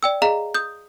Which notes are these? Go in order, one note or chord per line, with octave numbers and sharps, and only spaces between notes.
D5 G5 E6
G#4 D#5 F5 A#5 F7
D#6 G6